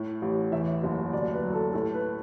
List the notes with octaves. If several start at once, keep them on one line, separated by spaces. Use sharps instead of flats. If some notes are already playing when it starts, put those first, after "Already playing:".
Already playing: A2
A1
E2 E5
F#1
D2 D5
B4
F#3
A4
A2 A4
B4